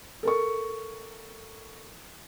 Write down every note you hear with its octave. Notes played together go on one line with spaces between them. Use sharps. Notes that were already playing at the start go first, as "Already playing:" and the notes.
A4 A#4 C#6